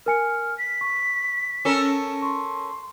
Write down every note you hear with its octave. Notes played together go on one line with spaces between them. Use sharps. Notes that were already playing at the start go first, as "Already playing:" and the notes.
A#4 G#5 F6 C#7
B6
C#6
C#4 A4 A#4
C6 C#6